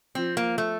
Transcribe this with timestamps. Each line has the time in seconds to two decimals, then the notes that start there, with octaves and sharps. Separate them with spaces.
0.15 F3 C4
0.37 A#3
0.58 A3